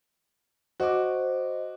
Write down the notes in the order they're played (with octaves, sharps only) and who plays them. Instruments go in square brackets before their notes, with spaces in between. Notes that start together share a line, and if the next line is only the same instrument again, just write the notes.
[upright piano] F#4 D6 [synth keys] C5 D#5